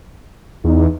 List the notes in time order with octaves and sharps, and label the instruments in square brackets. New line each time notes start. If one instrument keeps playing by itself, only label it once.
[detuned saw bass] E2 [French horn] D#4